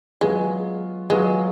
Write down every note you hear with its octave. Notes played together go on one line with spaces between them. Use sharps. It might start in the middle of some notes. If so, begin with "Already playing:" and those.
F#3 G#3 B3 F4
F#3 G#3 B3 F4